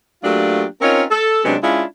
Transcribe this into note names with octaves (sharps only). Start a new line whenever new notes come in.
F#3 A3 A#3 D4 F4 G4
C4 C#4 D#4 F4 A#4 C#5
A4
C3 F#3 G#3 B3 C#4 D4
G#3 C#4 D4 E4 F4